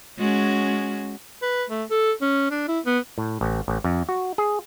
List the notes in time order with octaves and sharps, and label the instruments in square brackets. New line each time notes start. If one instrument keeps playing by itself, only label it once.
[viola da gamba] G#3 C#4 F#4
[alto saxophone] B4
A3
A4
C#4
D4
E4
B3
[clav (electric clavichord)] A2
A1
A1
F2
F#4
G#4